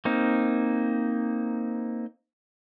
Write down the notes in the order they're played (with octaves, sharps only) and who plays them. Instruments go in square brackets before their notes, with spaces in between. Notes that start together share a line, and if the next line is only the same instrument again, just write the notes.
[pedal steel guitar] A#3 C4 D#4